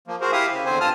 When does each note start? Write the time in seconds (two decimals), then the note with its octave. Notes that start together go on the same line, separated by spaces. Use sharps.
0.08 F3 A#3
0.21 F#4 G#4 A#4 C5
0.32 E4 G4 E5 F5 D#6
0.52 C#3
0.65 E2 D3 C4 C5 G#5
0.80 G2 F4 A5 D#6 F6